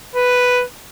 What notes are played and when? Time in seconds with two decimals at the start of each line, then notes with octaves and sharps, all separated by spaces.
0.16 B4